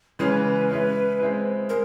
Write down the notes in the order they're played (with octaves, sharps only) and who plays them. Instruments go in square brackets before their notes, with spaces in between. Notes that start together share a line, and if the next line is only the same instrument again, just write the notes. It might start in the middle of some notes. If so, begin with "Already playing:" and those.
[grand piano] C#3 E3 G#3 C#4 [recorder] B4
[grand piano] G#3 C#4 E4
G#3 C4 E4
[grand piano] G#3 [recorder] A#4